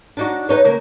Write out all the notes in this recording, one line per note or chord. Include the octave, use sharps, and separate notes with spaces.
D4 D#4 F#4
B3 D#4 C#5
C#3 A#3